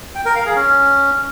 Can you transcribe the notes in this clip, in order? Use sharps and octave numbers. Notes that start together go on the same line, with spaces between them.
G5
A#4
F5
G#4
C#4